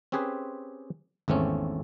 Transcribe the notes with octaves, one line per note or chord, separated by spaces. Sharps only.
C4 C#4 G4 G#4 B4 C5
G#1 E2 A3 C4 C#4